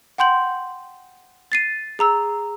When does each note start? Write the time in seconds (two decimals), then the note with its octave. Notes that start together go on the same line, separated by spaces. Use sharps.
0.18 F#5 G5 C6 G6 F#7
1.52 A6 C7 D#7
1.99 G#4 A#5 E6